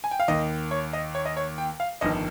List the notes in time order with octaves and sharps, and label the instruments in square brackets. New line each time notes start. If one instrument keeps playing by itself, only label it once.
[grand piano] G#5
G5
F5
D#2 D#3 D#5
C#5
D#5
C#5
D#5
C#5
G5
F5
G1 F2 D#3 D#5